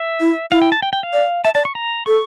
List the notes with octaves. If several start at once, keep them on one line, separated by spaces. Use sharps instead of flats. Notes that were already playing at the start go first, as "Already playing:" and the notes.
Already playing: E5
E4
E4 F5
G5
A5
G5
G5
F5
D5
E5 A5
D5 A5
C#6
A#5
A4 C#6